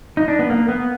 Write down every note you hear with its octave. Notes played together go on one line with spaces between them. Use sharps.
D#4
D4
B3
A#3
B3